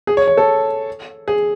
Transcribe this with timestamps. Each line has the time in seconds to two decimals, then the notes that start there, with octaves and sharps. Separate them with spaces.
0.07 G#4
0.17 C#5
0.28 C#5
0.37 A4
1.28 G#4